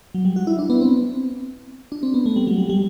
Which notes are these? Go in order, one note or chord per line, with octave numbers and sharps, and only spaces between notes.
F#3
G3
F#4
E4
D4
B3
C4
D4
C4
B3
A3
G3
F#3
G3
G3